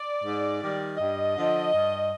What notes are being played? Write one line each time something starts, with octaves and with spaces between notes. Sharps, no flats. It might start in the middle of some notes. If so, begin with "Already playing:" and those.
Already playing: D5
G#2
D#3 G3
G2 D#5
D3 F3
G2